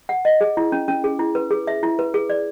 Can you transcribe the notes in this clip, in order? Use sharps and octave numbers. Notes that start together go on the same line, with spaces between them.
F#5
D#5
G#4
E4
C#4
C#4
G#4
E4
B4
G#4
E5
E4
B4
G#4
D5